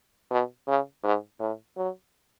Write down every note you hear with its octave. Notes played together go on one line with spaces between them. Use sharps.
B2
C#3
G#2
A2
F#3